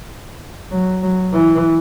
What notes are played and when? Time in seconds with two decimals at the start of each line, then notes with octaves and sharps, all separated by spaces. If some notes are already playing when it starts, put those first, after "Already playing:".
0.71 F#3
1.02 F#3
1.33 E3